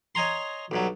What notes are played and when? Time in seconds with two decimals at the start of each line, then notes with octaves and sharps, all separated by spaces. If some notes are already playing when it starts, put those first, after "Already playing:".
0.15 C#5 D#5 G#5 A#5 C6
0.71 B1 G2 F#3